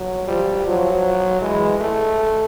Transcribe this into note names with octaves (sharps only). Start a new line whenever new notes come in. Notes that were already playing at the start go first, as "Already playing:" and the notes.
Already playing: F#3
F3 G3
F3 F#3
E3 G#3
A3